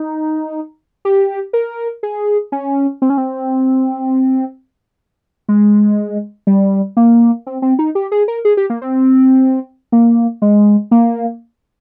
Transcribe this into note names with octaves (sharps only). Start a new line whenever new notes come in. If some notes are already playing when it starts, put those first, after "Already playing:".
Already playing: D#4
G4
A#4
G#4
C#4
C4
C#4
C4
G#3
G3
A#3
C4
C4
D#4
G4
G#4
A#4
G#4
G4
A#3
C4
A#3
G#3
A#3